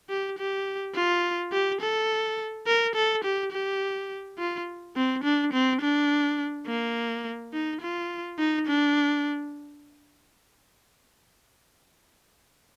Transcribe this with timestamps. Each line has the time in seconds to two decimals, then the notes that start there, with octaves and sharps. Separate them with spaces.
0.09 G4
0.38 G4
0.95 F4
1.52 G4
1.81 A4
2.67 A#4
2.95 A4
3.24 G4
3.52 G4
4.38 F4
4.96 C4
5.24 D4
5.53 C4
5.81 D4
6.67 A#3
7.53 D#4
7.82 F4
8.39 D#4
8.67 D4